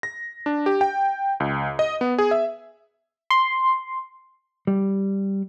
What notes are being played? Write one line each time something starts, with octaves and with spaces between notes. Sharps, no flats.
A#6
D4
G4
G5
C#2
D#5
B3
G#4
E5
C6
G3